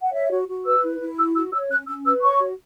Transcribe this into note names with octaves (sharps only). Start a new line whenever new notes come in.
F#5
C#5 E5
F#4
F#4
B4 E6
E4
E4
F#4 E6
F#4 E6
C#5 E6
C#4 F#6
C#4 E6
B4 E6
C#5 C#6
F#4